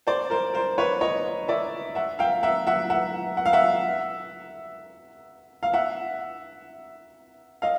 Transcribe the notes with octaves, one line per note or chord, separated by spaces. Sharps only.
C5 D5
A#4 C5
A#4 C5
B4 C#5
C#5 D#5
D5 E5
E5 F#5
F5 G5
E5 F#5
E5 F#5
E5 F#5
F#5
F5
E5 F#5
F5
E5 F#5
D#5 F5